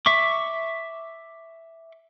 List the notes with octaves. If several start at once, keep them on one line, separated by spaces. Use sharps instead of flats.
E5 C#6 D6